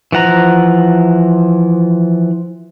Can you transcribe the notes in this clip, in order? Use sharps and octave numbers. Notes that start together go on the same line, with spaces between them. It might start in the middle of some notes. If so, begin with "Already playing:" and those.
E3 F3 F#5 A#5